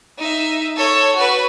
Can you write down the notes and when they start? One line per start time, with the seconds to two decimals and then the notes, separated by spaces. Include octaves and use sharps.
0.18 D#4 E5
0.77 A4 C#5
1.16 F#4 B4